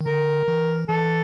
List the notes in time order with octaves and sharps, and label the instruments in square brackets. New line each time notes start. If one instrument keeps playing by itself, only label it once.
[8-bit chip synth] D#3
[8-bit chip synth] D3 [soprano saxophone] A#4
[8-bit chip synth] E3
[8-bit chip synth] E3 [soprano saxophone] A4